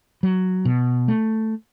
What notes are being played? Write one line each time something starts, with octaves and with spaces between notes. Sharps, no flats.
F#3
B2
A3